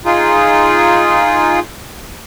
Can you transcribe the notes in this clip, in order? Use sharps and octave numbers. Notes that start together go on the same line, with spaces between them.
D#4 F4 G#4